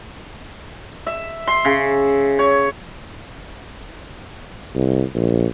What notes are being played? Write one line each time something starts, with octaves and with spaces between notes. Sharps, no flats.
E5
C6
C#3
C#5
C2
A#1